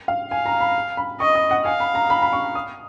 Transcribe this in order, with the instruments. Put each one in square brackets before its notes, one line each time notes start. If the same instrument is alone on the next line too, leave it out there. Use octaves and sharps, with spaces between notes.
[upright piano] F5
[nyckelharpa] F5 [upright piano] G#5
[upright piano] A#5
B5
B5
[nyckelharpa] D#5 [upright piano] C#6
[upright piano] D#6
F#5
[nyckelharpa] F5 [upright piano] G#5
[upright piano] B5
A#5
B5
B5
C#6
D#6